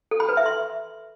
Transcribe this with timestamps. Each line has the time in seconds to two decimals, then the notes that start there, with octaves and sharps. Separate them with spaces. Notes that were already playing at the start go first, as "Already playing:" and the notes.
0.11 A4
0.20 B5
0.29 B4
0.37 E5
0.46 C6